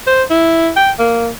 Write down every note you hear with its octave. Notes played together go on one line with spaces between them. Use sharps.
C5
E4
G5
A#3